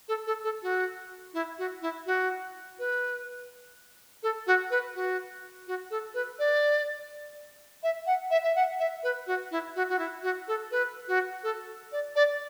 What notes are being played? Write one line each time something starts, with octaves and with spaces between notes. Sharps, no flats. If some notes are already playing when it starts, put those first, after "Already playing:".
A4
A4
A4
F#4
E4
F#4
E4
F#4
B4
A4
F#4
B4
F#4
F#4
A4
B4
D5
E5
F#5
E5
E5
F#5
E5
B4
F#4
E4
F#4
F#4
E4
F#4
A4
B4
F#4
A4
D5
D5